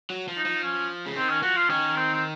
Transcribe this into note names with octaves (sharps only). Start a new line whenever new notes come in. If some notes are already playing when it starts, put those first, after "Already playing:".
F#3
F3
D#4
F3
C#4
C#3
D#3 C4
C#4
F3 F#4
F4
D#3 C#4
C4
C4